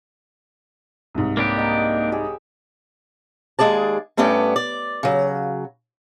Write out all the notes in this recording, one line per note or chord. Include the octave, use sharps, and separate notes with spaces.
C2 G#2
A#3 D4 G4 B4 C#5
D#5 A#5
G4 G#4 E6
D#2 G#3 G#4 D5 A5
G2 A3 B3 C#4 D5 G5
D5
C#3 F#3